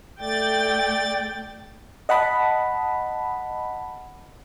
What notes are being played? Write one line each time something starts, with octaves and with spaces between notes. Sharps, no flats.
A3 D5 G5 A6
D#5 F#5 A5 B5